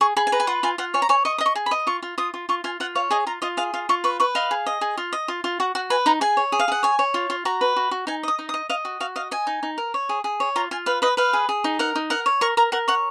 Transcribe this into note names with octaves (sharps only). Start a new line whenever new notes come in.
G#4 C#6
G#4 B5
G#5
B4 A#5
G#5
F4 F#5
F4 G#5
F4 F#5
C#5 G#5
A#5
C#5 G#5
D#5 C#6
D#5 D#6
C#6
G#4
B5
D#5
F4 C#6
F4
F4 D#6
F4
F4 C#6
F4 G#5
F4 F#5
C#5 F5
G#4 D#5
F4 A#5
F4 D#5
G#4 F5
F4 F5
F4 C#6
B4 C#6
B4 C#6
D#5 F5
G#4
D#5
G#4
F4
D#5
F4
F4
F#4 F#5
F#4 F#5
B4 G#5
D#4 A#5
G#4 G#5
C#5
G#4
F5
G#4 F#5
C#5 G#5
C#5
F4
F4
F#4 A#5
B4
F#4
F#4
D#4 G#5
D#5 D#6
D#4
D#6
D#5
D#5 F5
F#4
F#4 F5
D#5 F5
D#5 G#5
D#4
D#4
A#4
C#5
G#4
G#4
C#5
F4 A#5
F4 G#5
B4 F5
B4 D#5
B4 F5
G#4
G#4
D#4
A#4 F#5
D#4
A#4 F#5
C#5
A#4 C#6
A#4 A#5
A#4 F#5
C#5 F#5